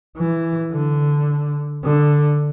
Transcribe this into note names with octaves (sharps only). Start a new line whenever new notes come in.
E3
D3
D3